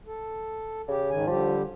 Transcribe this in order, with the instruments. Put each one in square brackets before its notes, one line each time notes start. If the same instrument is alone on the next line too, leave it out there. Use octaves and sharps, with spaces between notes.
[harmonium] A4
[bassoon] C#3 [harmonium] G4
[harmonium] G#2 D#3 G#5
[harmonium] D3 G3 G4 [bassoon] F3